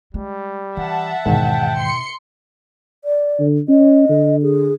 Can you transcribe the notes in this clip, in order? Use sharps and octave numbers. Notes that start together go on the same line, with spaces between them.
G3 G#3
E3 E5 F#5 A5
E2 G#2 B2 D#3 D#4 G5
C6 C#7
D5
D3
C#4 D#5
D3
G#4